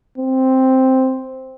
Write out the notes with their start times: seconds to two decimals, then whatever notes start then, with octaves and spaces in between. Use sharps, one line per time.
0.18 C4